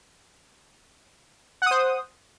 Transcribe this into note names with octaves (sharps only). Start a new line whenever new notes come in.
C5 F#5 D#6